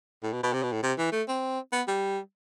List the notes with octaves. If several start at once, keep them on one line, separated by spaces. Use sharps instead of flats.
A2
B2
B2
C3
B2
A2
C3
E3
A3
C4
B3
G3